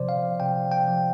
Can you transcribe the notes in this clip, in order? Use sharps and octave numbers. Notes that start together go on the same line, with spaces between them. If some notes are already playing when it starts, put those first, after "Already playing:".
Already playing: C3 F3 C5 D5
F5
C3 G5
G5
F3